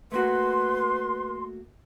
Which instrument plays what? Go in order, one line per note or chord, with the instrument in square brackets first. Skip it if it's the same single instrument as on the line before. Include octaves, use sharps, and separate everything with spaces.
[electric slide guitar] A3 A#3 F#4 [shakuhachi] B4 [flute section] C6